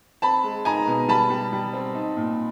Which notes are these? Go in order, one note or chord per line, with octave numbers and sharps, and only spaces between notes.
C4 A5 B5
G#3
D#4 G#5 A#5
B2
G3 A5 B5
G3
G3
C4
D#4
A#2